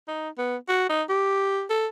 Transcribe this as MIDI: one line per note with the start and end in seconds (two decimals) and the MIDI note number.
0.08 0.29 63
0.38 0.56 59
0.68 0.88 66
0.89 1.03 63
1.09 1.65 67
1.70 1.87 69